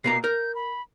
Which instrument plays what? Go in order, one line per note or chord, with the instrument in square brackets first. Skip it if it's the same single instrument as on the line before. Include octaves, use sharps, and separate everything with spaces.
[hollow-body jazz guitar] B2 A#3 A#5 [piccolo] C7
[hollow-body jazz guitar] A#4 [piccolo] G6
[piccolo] B5